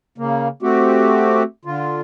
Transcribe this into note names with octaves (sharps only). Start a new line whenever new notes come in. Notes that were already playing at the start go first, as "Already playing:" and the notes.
C#3 A#3
A3 C4 F#4 G4
D3 F4